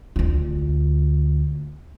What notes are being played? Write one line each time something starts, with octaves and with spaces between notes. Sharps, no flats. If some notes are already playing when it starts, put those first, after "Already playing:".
D2 F4